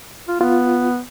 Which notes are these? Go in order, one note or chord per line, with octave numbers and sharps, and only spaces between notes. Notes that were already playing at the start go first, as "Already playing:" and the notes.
F4
B3 F4